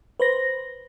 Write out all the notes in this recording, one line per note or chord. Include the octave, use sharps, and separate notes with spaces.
B4 C5 A#6